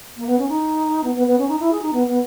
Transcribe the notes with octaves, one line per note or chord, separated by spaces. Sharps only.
A#3
B3
C#4
D#4
B3
B3
B3
C#4
D#4
E4
G#4
D#4
B3
B3